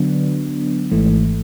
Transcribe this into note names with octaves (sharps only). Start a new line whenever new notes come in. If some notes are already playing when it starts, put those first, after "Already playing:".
Already playing: D3 F#3 B3 D4
G#1 G#2 E3 A3